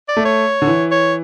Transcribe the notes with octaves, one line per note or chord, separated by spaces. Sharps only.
D5
A3
C#5
D3
E3
C#5